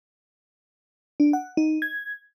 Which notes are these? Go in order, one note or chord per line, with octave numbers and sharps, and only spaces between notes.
D4
F#5
D#4
G#6